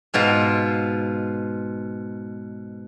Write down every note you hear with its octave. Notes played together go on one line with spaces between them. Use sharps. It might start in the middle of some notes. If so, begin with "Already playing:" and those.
G#2 B2 F4 A#5